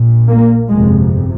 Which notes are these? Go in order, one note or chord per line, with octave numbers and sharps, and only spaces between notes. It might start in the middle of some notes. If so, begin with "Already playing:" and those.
Already playing: A#1 A#2
A#3
G1 F2 C3 G#3